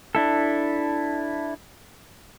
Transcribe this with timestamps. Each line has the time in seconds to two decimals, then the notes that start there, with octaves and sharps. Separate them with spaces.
0.15 D4 E4 A4